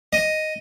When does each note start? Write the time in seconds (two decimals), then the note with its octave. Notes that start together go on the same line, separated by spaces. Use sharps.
0.13 D#5